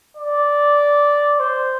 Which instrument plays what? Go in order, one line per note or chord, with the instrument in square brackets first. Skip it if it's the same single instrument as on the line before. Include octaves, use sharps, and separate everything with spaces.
[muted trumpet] D5
C5